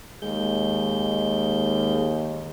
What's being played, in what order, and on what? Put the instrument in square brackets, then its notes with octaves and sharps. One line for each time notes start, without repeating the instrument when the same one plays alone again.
[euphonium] D#2 [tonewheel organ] G#3 G6